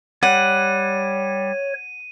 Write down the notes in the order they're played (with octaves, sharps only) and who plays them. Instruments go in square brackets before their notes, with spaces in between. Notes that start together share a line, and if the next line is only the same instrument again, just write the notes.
[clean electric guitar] G3 [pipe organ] C#5 [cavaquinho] F#5 [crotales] D#7